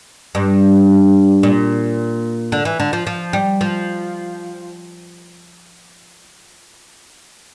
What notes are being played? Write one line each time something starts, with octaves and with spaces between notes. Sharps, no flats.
G2
A#2
D3
E3
D3
F3
F3
G3
F3